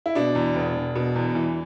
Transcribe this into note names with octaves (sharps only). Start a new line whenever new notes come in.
E4
B2 D4
E2
E1
E1
B2
E2
E3